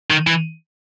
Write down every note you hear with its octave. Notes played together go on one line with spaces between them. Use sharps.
D#3
E3